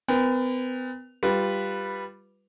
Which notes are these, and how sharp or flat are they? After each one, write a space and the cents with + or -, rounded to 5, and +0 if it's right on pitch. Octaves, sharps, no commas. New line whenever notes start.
B3 +45 A#4 +40 G5 +45
G3 +0 F4 +0 B4 +0